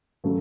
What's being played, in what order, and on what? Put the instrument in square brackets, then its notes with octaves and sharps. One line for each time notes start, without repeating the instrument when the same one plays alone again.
[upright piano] C#3 F#3 A3